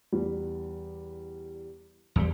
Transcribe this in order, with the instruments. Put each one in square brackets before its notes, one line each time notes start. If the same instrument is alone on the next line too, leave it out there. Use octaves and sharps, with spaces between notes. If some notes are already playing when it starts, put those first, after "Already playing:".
[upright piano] E2 G3
[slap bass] E2 G3